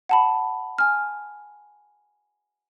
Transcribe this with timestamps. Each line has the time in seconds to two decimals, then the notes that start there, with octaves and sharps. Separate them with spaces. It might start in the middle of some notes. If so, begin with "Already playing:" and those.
0.09 F#5 A5 B5
0.78 G#5 F6